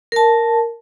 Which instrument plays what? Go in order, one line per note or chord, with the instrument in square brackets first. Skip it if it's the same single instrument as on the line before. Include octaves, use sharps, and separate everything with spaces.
[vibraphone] A#4 A5